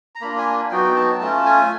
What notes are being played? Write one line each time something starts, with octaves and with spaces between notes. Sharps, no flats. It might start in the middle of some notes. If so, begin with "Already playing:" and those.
A#5
A#3 D4 F4 B5
G#5
F#3 B3 D#4 F#4 G5
A5
A3 C#4 F4 A5
G#5